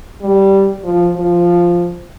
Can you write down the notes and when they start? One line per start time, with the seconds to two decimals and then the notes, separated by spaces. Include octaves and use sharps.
0.22 G3
0.84 F3
1.16 F3